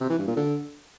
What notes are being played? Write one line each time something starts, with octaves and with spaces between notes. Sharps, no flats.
C3
E3
G2
A#2
D3